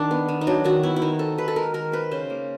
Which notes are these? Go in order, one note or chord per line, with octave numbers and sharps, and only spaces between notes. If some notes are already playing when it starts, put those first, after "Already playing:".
Already playing: D#3 D4
B3
D#3
D#4
F#3 D4
D#3 F#4
B3 E4
E4
D#3 D#4
C4 A4
D#3 B4
A4
G#3 A#4
D#3 A#4
C4 B4
C#3 C5
A#3